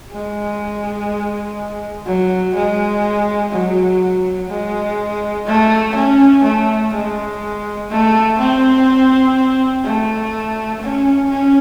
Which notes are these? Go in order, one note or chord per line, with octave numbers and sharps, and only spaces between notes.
G#3
F#3
G#3
F#3
G#3
A3
C#4
A3
G#3
A3
C4
A3
C#4
C#4